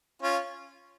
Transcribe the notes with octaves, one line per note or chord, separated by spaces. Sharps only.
C#4 F4